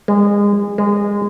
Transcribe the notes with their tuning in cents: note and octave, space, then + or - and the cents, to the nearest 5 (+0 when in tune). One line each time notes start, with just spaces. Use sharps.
G#3 -30
G#3 -25